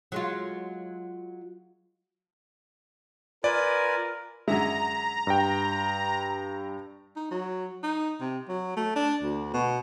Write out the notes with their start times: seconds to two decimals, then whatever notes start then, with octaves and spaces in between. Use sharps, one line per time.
0.12 F#3 G#3 F4
3.44 F4 A#4 B4 D5 G#5
4.48 F#2 D3 G#3 E5 A#5
5.27 G2 G5
7.16 D#4
7.31 F#3
7.83 D#4
8.20 C3
8.48 F#3
8.76 A3
8.95 D4
9.22 D2
9.53 B2